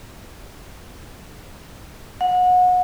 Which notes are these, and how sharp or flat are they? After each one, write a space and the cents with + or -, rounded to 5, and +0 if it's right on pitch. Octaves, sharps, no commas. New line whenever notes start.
F#5 -30